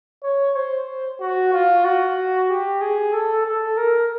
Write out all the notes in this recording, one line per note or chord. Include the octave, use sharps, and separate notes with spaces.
C#5
C5
F#4
F4
F#4
G4
G#4
A4
A4
A#4